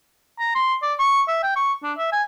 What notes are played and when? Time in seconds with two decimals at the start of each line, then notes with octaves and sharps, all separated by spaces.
0.39 A#5
0.55 C6
0.82 D5
0.99 C#6
1.28 E5
1.43 G5
1.56 C#6
1.83 D4
1.98 E5
2.12 G#5